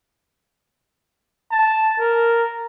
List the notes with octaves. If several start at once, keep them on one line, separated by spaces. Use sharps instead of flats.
A5
A#4